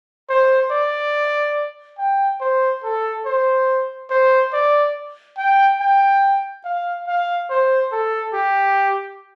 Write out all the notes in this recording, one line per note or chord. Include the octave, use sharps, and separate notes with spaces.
C5
D5
G5
C5
A4
C5
C5
D5
G5
G5
F5
F5
C5
A4
G4